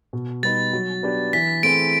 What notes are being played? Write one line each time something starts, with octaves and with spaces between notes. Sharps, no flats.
B2
G3 B3 D#4 A6
F#3
B3 D4 G4
E3 B6
A3 C4 E4 G#4 D7